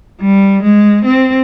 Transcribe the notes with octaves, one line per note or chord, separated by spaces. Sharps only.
G3
G#3
C4